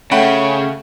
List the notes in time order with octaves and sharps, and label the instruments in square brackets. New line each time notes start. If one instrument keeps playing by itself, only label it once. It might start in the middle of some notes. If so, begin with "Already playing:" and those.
[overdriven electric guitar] C#3 [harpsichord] A3 [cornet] C#5 [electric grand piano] F#5 G5 B5